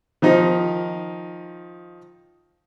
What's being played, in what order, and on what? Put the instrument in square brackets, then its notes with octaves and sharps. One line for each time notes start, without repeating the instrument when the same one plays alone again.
[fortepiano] D#3 F3 D#4